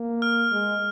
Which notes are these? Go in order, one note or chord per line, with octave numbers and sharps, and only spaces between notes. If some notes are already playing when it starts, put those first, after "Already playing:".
Already playing: A#3
F6
G#3